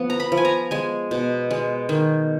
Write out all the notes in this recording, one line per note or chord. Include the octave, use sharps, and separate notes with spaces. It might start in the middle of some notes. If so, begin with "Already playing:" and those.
Already playing: F3 B3
A#5
B5
F3
G#5
A#5
G#3 G#5
B2
G#3
D#3